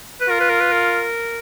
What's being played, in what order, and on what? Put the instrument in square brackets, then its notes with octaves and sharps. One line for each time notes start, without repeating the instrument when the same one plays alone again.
[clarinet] B4
[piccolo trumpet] F4 [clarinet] A#4
[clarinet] B4
A#4
B4
A#4